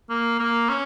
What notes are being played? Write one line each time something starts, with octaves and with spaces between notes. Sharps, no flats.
A#3
A#3
C#4